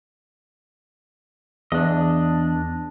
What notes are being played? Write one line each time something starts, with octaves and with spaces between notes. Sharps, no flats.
E2 D4 D#5